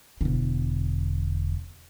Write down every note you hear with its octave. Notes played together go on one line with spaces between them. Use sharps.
E1 D3